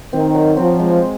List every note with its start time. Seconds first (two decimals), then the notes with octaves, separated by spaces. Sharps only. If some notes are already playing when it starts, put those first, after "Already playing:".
0.13 D#3 C4
0.35 F#3
0.57 F3 C4
0.80 G#3